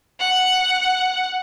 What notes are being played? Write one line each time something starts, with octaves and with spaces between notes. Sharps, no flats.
F#5